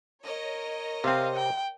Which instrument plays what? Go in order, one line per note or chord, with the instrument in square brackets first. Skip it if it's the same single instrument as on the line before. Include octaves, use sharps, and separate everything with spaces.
[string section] A#4 C#5 D#5
[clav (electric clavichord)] C3 C4 [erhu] F5
[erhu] G5